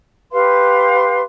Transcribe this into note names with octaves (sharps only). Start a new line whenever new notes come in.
G4 B4 F5 C6